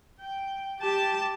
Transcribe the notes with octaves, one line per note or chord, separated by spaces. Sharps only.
G5
G4 A5